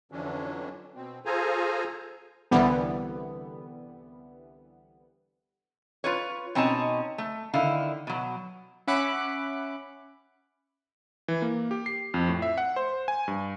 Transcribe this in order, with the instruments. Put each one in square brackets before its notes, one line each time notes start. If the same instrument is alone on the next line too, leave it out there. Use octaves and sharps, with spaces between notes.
[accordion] F2 D3 E3 F#3 C#4 D4
B2 C4
F4 G#4 A4 C5 G#5 A#5
[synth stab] C2 D3 E3 G3 B3
[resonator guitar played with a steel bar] F4 B4 C#5
B2 C4 C#4 D#4 D#5 A5
A3
D3 D#3 E4 F5
B2 F#3
[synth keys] C#4 E5 F#5 B5 D6 F#6
[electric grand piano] E3
A#3
G4
C7
F2
A2
E5
F#5
C5
G#5
G2